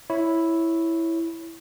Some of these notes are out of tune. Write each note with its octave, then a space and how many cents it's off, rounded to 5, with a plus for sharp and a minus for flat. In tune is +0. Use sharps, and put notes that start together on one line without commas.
E4 +0 C#5 +0